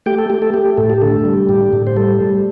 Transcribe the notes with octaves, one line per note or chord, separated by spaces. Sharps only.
A3 G4 G5
A4
A3 G4
A4
A3 G4
A2 A4
G4
D3 A4
G3
A2 G4
A2
C5
G3 A4
G3